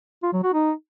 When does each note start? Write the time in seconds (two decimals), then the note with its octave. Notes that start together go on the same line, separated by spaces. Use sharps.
0.23 F4
0.33 F#3
0.43 F#4
0.54 D#4